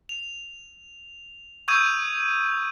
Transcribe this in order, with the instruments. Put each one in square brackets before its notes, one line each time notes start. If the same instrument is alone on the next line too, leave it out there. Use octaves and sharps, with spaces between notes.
[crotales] F7
C#6 D#6 E6 G6 G#6 D#7